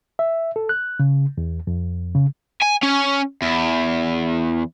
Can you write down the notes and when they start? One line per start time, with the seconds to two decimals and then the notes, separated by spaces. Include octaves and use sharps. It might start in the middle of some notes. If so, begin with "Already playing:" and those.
0.19 E5
0.56 A4
0.69 F#6
1.00 C#3
1.38 E2
1.67 F2
2.15 C#3
2.62 G#5
2.83 C#4
3.42 E2